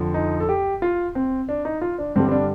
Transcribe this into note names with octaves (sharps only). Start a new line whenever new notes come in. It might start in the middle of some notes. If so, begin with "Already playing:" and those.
Already playing: F2 D3 F3
D#4
A4
G4
F4
C4
D4
D#4
F4
D4
G2 D3 G3 C4
C4
D4